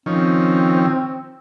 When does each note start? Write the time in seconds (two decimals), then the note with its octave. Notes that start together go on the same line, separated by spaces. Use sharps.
0.06 D#3 F3 C4 C#4